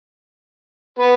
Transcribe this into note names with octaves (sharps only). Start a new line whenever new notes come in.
B3 B4